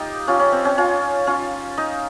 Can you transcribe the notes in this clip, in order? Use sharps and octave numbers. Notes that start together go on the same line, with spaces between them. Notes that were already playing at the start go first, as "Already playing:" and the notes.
Already playing: D#4 F4 G4
C#4 F4
C#4
C4
C#4
C#4 F4
C#4 F4
D#4